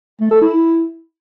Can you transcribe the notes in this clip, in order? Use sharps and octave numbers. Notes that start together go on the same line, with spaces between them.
A3
A4
E4